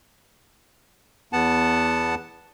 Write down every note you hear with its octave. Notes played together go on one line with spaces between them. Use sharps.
E2 B3 F#5 A5